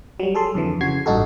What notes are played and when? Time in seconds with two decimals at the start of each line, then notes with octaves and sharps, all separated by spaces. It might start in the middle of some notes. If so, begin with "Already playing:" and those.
0.20 F#3 G3
0.35 G#4 A4 C6
0.55 F2 D3 E3
0.81 C#3 F#4 G#6 C7
1.06 A1 G2 D#4 F#4 A4